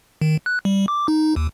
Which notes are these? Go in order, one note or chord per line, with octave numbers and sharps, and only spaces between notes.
D#3
F#6
G3
D6
D#4
D#2